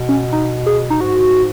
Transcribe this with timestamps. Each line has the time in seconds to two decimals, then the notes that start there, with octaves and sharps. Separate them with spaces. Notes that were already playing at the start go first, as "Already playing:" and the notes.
Already playing: B2
0.09 C#4
0.33 D#4
0.66 G#4
0.90 D#4
1.01 G#2 F#4